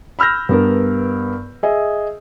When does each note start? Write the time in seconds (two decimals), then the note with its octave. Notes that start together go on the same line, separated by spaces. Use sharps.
0.19 B5 E6 F6 G6 A#6
0.49 G2 B3 A#4
1.63 G#4 D#5 E5